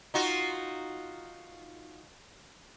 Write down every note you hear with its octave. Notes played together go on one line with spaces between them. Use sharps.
D#4 F4 F#4